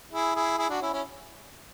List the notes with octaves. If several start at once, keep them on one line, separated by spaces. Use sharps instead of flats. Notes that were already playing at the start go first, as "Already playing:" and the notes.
E4 G#4
E4 G#4
E4 G#4
D4 F#4
C#4 E4
C#4 E4